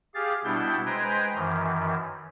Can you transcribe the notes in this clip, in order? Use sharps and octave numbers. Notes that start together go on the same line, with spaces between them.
G4 G#4 F5 A6
B2 G3 B3 D4 E4 G6
G#3 B4 C5 G5 G#5 A#5
F#2 D#3 E3